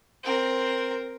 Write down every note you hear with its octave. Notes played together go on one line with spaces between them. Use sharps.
C4 A#4